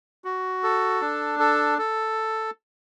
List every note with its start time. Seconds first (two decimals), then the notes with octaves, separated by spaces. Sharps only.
0.24 F#4
0.63 A4
1.01 D4
1.39 A4
1.78 A4